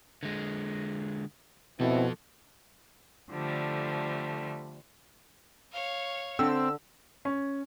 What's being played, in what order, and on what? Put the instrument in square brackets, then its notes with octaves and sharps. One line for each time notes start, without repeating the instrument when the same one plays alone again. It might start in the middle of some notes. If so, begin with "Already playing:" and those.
[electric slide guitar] D3 G#3
[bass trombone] B2 [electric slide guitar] F3 A4 [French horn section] C4 E4
[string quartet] D3 F3 G3 A3
[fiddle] C#5 F5
[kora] D3 [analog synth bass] C4 [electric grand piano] E6
[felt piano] C#4